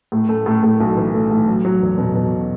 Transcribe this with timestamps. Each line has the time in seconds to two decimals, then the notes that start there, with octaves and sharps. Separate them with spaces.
0.12 A2
0.29 A3
0.46 A2
0.63 A2
0.80 B1
0.97 E3
1.14 A3
1.31 A2
1.48 F#3
1.65 F#3
1.81 E2
1.98 B2
2.15 B2